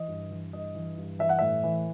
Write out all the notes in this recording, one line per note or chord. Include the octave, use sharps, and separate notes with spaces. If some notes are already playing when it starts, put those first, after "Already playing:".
Already playing: E3 D#5
G2
E3
G2 D#5
E3
G2
E3 E5
F#5
A2 E5
E3